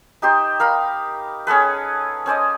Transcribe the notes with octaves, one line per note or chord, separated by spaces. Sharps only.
D#4 G4 C5
A#4 F5 B5
C#4 G#4 A4 B4
C#4 C5 D5 D#5